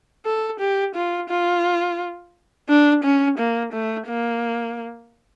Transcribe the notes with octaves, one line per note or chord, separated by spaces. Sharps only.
A4
G4
F4
F4
D4
C#4
A#3
A3
A#3